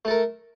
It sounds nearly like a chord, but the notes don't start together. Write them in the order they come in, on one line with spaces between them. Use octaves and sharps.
A3 A4 A#4